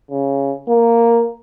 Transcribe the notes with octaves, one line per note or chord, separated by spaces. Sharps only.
C#3
A#3